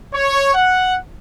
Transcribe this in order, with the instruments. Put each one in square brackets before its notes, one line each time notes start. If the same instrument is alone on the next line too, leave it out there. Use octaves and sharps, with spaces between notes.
[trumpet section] C#5
F#5